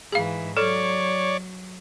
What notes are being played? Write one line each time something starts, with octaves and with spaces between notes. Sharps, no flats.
G#2 E3 G#4 F5
F#3 A4 C#5 D5